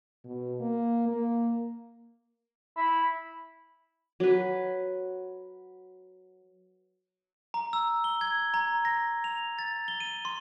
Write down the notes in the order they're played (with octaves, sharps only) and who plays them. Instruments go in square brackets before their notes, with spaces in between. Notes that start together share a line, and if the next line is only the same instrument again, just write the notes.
[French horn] B2
A#3
A#3
[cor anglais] E4
[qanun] F#3 B4
[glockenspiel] A#5
E6
G7
G#6
A#5
A#6
F7
A6
G7
D#7
C6